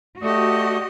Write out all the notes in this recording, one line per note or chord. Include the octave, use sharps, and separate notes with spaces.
A3 F#4 G4 D5 D#5 D#6